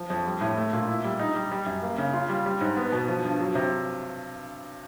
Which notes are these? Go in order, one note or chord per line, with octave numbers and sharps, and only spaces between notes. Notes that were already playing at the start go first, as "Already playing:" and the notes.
Already playing: F3
F2
G3
A2
A3
A#2
E4
G3
D#4
G3
G3
F#2
A#3
C#3
F4
G3
G3
G#2
B3
B2
F3
G2
F#3
C3